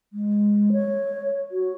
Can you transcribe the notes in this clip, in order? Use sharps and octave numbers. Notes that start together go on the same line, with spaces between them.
G#3
C#5
F#4